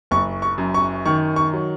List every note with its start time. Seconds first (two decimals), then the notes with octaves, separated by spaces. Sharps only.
0.11 F#1 C#6
0.42 C#6
0.58 F#2
0.74 C#6
1.06 D#3 C#6
1.36 C#6
1.53 F#3